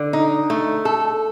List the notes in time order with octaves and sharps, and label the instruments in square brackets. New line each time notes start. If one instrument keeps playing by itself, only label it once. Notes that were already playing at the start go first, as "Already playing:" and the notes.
Already playing: [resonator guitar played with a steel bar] D3
D#4
A3
A4